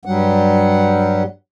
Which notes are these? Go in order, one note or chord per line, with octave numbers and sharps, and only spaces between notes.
G2 F#3 G3 F#5